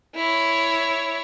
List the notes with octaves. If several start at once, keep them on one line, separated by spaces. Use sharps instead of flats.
E4 C#5